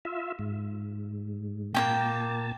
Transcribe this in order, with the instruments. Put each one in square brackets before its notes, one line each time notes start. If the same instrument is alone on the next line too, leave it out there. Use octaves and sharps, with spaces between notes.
[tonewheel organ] F4 E5
G#2
[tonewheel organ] A#2 A5 [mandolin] A#3 C#4 G5